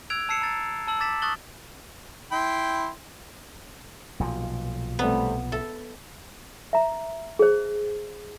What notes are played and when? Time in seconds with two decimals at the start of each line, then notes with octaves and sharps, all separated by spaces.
0.10 E6 F#6 G#6 D7 F7
0.29 A5 E6 C7 C#7 E7
0.42 A#5 A6
0.88 A5 E6 F#7
1.00 D6 A6 B6 E7
1.22 C#6 D#6 F#6 A6 F#7 G7
2.32 E4 G5 C6
4.19 B1 A#2 F3
4.99 C3 G3 A3 B3
5.52 A4 E5
6.73 E5 A#5
7.39 G#4 C5